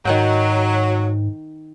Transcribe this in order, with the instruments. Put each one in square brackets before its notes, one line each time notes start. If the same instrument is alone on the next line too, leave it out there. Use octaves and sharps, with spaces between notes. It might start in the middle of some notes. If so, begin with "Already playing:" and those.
[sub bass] G#2 [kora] D#3 F#5 G5 [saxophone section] F#3